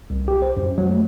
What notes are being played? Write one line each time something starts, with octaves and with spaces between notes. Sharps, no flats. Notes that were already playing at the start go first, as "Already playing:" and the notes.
C2
G4
C5
F#2
F#3
A3